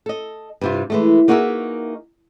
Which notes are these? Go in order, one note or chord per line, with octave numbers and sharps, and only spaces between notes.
A4 D#5
G2 C3 F4
E3 G#3 A3
A#3 D#4 F#4 G#4 A#4 E5